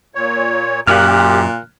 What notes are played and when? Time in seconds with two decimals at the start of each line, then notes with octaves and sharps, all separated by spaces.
0.15 A#2 C#5
0.87 F#2 A#2 G4 F6 F#6